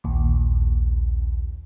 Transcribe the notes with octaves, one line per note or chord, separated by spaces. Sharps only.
A#1 D#2